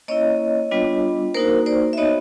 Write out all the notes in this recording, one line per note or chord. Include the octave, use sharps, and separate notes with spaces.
A#3 C#4 E4 C#5 D#5
G3 B3 D4 F4
A#3 D#4 F#4 A#4 C5
C5 D5
E5
B3 D#4 F#4 C#5 D#5